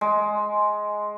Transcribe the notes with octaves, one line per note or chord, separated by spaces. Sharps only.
G#3